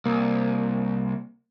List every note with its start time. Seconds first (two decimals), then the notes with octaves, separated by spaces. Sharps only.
0.05 C2 A#3